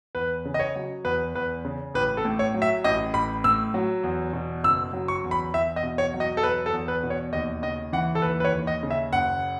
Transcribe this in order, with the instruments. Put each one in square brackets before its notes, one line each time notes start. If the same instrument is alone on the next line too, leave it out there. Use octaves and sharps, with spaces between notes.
[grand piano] E2 B4
C#3
D#5
C#5
F#3
E2 B4
E2 B4
C#3
A1 B4
A4
A2
C#5
F#3
E5
A1 D#5
A1 B5
A2 E6
F#3
E2
B2
F#1 E6
F#3
C#6
E2
B5
E2 E5
D#5
B2
C#5
F#3
D#5
A4
E2 B4
A4
E2
B4
B2
C#5
D#2 D#5
C#3 D#5
E3 F#5
A4
D#2 B4
B4
C#5
D#2
D#5
C#3
E5
F#1 F#5